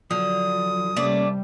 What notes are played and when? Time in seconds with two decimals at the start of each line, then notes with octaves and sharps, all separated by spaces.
0.11 D3 F3 F#3 D#6
0.96 C3 G3 A3 A#3 C#4 D5